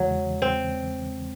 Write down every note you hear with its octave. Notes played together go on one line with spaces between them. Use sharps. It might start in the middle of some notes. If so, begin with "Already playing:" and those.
Already playing: E2 C#3 E3 F#3 G#3
C4